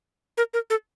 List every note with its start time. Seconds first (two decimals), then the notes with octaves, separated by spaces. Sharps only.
0.38 A#4
0.54 A#4
0.70 A4